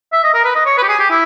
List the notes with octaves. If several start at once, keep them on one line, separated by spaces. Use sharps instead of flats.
E5
D#5
A#4
B4
D#5
C#5
B4
G4
G#4
G4
E4